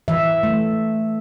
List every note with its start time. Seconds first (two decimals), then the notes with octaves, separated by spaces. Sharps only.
0.08 E3 E5
0.43 A3